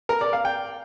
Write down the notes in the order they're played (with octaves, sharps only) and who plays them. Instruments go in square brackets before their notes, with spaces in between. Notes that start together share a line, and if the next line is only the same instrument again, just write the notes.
[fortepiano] A#4
D5
F5
G5